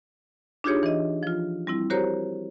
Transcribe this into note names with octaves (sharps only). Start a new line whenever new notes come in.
D4 D#4 F4 G4 G#4 C#5
E3 D#5
F3 F4
G3 C4 E4
F#4 G4 A#4 C5 C#5 A#5